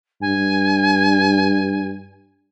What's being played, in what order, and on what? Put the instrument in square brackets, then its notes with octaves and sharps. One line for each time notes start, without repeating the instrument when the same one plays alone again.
[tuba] G2 [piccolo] G#5